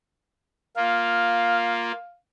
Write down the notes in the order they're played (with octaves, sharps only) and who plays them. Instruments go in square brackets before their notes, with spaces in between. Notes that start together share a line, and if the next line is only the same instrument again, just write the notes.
[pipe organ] A#3 F4 [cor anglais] F5